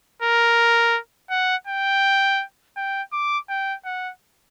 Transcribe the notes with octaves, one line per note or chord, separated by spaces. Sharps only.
A#4
F#5
G5
G5
D6
G5
F#5